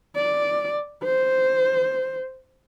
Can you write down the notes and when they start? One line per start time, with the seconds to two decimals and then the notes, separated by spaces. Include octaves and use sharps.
0.16 D5
1.04 C5